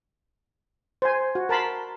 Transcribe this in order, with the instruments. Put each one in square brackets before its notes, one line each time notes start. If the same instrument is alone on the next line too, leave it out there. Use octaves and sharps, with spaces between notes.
[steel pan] C5 G#5
F#4
A#4 A5 B5 C6